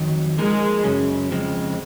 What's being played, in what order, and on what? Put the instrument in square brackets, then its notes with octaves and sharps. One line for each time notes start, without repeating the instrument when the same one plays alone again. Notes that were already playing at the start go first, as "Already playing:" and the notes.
Already playing: [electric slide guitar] F2 D#3 F#3
[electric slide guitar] F3 A#3 D#4 A#4 [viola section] G#3
[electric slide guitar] F#2 C#3 F#3 C#4
F2 C#3 F3 G#3 C4